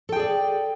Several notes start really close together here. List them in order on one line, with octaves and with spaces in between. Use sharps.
A4 G5 G#4 D5